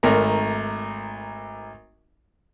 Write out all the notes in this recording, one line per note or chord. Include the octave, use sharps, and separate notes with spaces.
G#1 A3 A#4 A#5